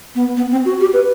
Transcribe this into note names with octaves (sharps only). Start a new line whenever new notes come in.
B3
B3
C4
F#4
G4
B4